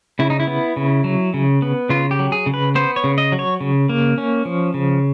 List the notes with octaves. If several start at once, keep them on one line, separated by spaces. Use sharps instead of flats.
C#3 E4
D#4
E4
B3
C#3
F#3
C#3
B3
C#3 F4
G4
F#3
G#4
C#3
B4
B3 C5
C#5
C#3
D#5
F#3
C#5
C#3
A#3
C#4
F3
C#3